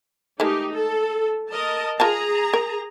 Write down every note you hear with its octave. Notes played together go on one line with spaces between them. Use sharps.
D#3 G#3 A3 D#4 G4
A4
A#4 D#5 A5
F4 G#4 A#4 A5 A#5
A#4